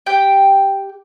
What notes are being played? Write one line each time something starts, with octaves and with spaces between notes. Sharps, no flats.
G4 G5